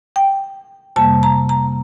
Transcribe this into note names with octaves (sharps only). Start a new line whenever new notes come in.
G5
F2 C3 G3 A#3 A5
A#5
A#5